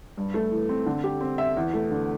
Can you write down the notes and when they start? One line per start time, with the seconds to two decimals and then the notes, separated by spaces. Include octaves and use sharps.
0.18 G2
0.34 A3
0.51 E3
0.69 C4
0.86 D3
1.04 G4
1.21 C4
1.38 E5
1.57 E2
1.73 A3
1.91 D3